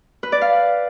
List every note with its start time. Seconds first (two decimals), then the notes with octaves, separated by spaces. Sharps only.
0.23 B4
0.32 D5
0.41 F5